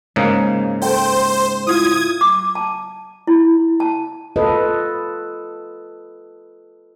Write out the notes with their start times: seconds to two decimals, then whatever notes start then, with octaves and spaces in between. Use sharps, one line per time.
0.16 G#2 C#3 A#3 G#4 C#5 G#5
0.82 A4 C5 G5
1.67 E4 F4 D#6 G#6
2.21 D6
2.55 A5
3.27 E4
3.80 A5
4.36 F4 A4 B4 D#5